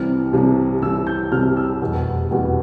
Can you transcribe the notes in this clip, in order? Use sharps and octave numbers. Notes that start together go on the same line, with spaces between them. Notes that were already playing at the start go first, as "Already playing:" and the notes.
Already playing: C2 C3 E3 G3 F6
C2 C3 E3 G3
C2 C3 E3 G3 E6
G6
C2 C3 E3 G3 F6
E6
F1 E2 B2 G3
F1 E2 B2 G3